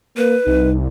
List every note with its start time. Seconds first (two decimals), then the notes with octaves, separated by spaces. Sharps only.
0.17 A#3 B4
0.46 C2 D#4